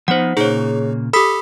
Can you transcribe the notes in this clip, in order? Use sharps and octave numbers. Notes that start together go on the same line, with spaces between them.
F3 B3 D#4 C5 F#5
A#2 C#3 A#3 D#4 G#4 C#5
G4 A4 B5 D#6 B6